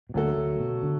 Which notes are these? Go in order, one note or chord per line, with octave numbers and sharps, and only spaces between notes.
B2
D2 D3 F#3 A3 F#4 A4
D2 D3
B2 B3
D3